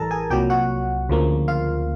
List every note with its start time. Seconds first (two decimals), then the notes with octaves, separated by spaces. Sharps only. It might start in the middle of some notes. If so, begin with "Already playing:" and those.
Already playing: A1 A2 E3 G3 A4 A#4 A5 A#5
0.11 G#4 G#5
0.30 C2 A#2 F#3 G4 G5
0.50 F#4 F#5
1.09 D2 C#3 F3 A#3
1.48 F4 F5